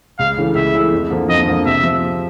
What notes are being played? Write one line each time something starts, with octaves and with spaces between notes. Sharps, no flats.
C#2 F5
C#3 E3 A3
C#2 E5
C#3 E3 A3
F2
D3 F3 A#3
F2 D#5
D3 F3 A#3
C3 E5
F3